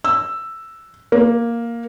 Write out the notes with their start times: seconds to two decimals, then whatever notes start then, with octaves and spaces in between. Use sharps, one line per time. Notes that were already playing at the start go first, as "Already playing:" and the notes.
0.04 E6
1.12 A#3